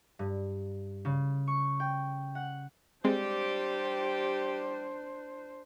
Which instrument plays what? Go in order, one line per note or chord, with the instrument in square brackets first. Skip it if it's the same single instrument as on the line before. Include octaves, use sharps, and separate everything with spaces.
[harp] G2
C#3
C#6
G5
F#5
[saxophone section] G3 G4 [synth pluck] G#3 C4 [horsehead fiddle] D4 C5